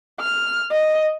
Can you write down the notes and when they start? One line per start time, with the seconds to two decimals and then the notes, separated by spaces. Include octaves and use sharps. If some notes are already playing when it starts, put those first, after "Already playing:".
0.21 F6
0.71 D#5